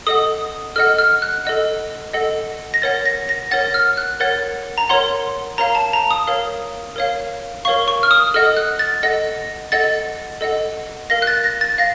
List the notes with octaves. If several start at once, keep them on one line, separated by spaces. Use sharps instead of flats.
A4 D#5 F#5 D#6
A4 D#5 F#5 F6
F6
F#6
A4 D#5 F#5
A4 D#5 F#5
A#6
A#4 C#5 F#5 A6
A#6
A#6
A#4 C#5 F#5 A6
F6
F#6
A#4 C#5 F#5 A6
A#5
A#4 C#5 F#5 C6
A#4 C#5 F5 A#5
A5
A#5
D#6
A#4 C#5 F5
A#4 C#5 F5
A#4 C#5 F5 C#6
C#6
F6
D#6
A4 D#5 F#5 F6
F#6
A6
A4 D#5 F#5 A#6
A4 D#5 F#5 A6
A4 D#5 F#5
A#4 F5 A#6
F#6
A6
A#6
A6
F5 A#6